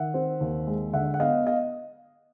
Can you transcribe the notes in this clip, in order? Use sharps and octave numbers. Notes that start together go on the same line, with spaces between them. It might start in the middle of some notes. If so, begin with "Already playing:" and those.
Already playing: D#3 E5 F#5
C4
D#2
G#3
D3 E5 F#5
F#5
B3 D#5 F5
D#5 F5